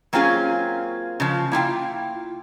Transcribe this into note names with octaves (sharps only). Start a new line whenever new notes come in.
F#3 A#3 C4 C#4 F4 G#4
C#3 F3
A#3 E4 F4 G5